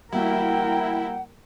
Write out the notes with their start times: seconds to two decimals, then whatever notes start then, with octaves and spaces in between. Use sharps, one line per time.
0.12 G3 A#3 E4 F#4 A#4 F#5 G5